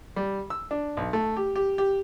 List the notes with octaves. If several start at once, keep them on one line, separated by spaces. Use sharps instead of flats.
G3
E6
D4
B1
A3
G4
G4
G4